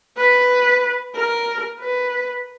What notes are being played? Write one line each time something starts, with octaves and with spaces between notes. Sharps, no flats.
B4
A#4
B4